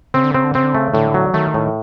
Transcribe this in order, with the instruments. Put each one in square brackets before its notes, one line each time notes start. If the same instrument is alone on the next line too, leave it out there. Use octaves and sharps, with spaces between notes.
[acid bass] C#3 [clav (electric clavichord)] C4
[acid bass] D3
[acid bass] C#3 [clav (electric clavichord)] C4
[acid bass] D3
[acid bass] C#3 [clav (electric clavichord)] C4
[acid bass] D3
[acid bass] C#3 [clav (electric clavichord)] A3
[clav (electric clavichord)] A2 [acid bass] D3
[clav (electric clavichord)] F#3
[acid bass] D#3 [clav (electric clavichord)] A3
[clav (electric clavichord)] A2